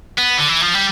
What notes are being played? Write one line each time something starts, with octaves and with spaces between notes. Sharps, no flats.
B3
D3
E3
F3
G3